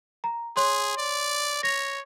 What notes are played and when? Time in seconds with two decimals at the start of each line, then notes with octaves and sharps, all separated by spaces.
0.24 A#5
0.57 G#4 C#5 C6
0.98 D5
1.63 C#5 A#6 F7